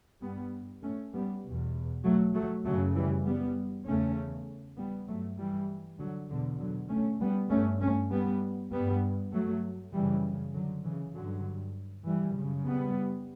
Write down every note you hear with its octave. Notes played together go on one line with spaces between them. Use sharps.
G2 G3 B3
A3 C#4
G3 B3
E2 B2
F#3 A3
F#3 A3
F#2 C#3 F#3 A3
E3 G3
G3 B3
E2 C#3 A3 C#4
G3 B3
G2 F#3 A3
E3 G3
D3 F#3
E2 B2 D3
D3 F#3
A3 C#4
G3 B3
G2 A3 C#4
A3 C#4
G3 B3
G2 G3 B3
F#3 A3
F#2 C#3 E3 G3
D3 F#3
C#3 E3
G2 D3 F#3
E3 G3
F#2 C#3
G3 B3